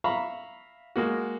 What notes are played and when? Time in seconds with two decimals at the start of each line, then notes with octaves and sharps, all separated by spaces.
0.04 E5 F5 A#5 B5 C#6
0.96 G#3 A#3 F#4